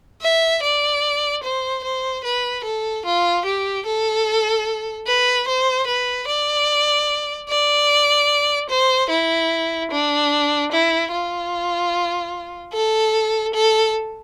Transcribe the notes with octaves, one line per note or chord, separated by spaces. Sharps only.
E5
D5
C5
C5
B4
A4
F4
G4
A4
B4
C5
B4
D5
D5
C5
E4
D4
E4
F4
A4
A4